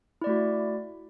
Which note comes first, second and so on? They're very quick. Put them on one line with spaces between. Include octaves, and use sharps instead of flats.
E4 D5 A3 F#4